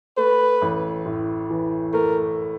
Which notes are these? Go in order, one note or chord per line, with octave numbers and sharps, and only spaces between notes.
A3 B4
A1
A2
E3
A3 A#4